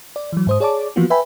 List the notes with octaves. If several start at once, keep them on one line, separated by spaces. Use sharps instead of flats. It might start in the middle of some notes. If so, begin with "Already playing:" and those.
D5
E3 F#3
G#2 C5 D#6
G#4 C#5 D5 A5 D6
E3 F3 A#3 B3 F4 F#4
B4 E5 G5 G#5 B5